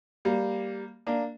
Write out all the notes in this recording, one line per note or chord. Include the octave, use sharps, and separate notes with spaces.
G3 A#3
A#3 D4